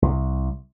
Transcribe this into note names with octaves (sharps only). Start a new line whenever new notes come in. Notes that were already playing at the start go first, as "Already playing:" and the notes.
C2